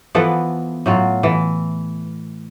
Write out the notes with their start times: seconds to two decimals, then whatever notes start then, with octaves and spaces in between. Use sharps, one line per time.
0.15 E3 F3 B3 A4
0.86 A2 F#3 F4
1.23 E3 A4